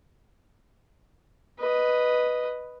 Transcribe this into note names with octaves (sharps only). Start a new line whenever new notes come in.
B4 D#5